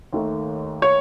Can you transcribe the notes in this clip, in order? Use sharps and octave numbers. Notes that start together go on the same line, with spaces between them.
D#2 D#3 A3
C#5